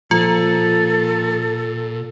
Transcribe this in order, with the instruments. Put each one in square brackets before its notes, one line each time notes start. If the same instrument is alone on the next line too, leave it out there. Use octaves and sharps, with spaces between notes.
[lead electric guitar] A#2 [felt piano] F3 [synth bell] F4 [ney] A4